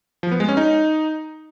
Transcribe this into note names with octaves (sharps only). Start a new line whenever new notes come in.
F3
B3
G#3
C#4
D#4